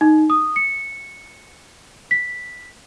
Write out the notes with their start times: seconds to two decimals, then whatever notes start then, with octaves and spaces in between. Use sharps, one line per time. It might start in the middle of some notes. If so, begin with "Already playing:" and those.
0.01 D#4
0.30 D#6
0.56 C#7
2.11 B6